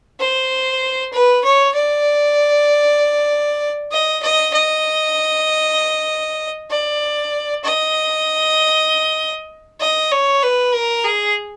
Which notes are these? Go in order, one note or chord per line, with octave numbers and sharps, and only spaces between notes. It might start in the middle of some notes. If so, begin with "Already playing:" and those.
C5
B4
C#5
D5
D#5
D#5
D#5
D5
D#5
D#5
C#5
B4
A#4
G#4